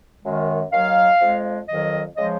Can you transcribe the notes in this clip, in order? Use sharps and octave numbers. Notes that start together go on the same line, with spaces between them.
F#2 D#3 G#3
D#2 D#3 F#3 F5
F2 F3 G#3
F2 D#3 F#3 D#5
C#3 F3 G#3 D#5